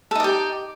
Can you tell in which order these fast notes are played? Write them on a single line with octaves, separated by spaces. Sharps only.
A4 D#4 D5 G4